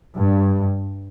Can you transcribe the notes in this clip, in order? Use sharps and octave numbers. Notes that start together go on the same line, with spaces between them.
G2